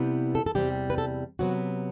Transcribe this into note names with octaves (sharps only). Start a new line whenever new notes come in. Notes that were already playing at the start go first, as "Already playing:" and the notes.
Already playing: C3 E3 G3 B3
A4
A4
E2 C3 G3 G4
B4
A4
C3 F#3 B3 F#4